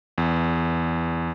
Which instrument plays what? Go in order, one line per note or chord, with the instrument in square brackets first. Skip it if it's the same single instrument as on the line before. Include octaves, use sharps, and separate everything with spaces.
[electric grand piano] E2